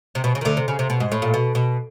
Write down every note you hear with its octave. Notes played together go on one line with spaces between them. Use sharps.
C3
B2
C#3
D#3
D2 D3
C3
C#3
C3
B2
G#2
A2
A#2
B2
B2